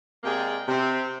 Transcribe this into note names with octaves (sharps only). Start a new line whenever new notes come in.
C3 G#3 A#3 G#4 D5 G5
C3 C4